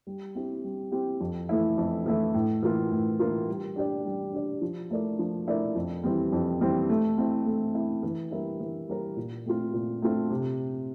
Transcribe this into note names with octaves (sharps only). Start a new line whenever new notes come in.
G3
C4 E4 G4
G3
C4 E4 G4
F2
E3 A3 E4
F2
E3 A3 E4
A2
E3 A#3 F4
A2
E3 A#3 F4
G3
D4 G4 D5
G3
D4 G4 D5
F3
A3 E4 A#4 D5
F3
A3 E4 A#4 D5
F2
E3 G3 C4
F2
E3 G3 C4
A3
C4 E4
A3
C4 E4
E3
G3 A#3 E4 A#4
E3
G3 A#3 E4 A#4
A#2
A3 C4 F4
A#2
A3 C4 F4
C3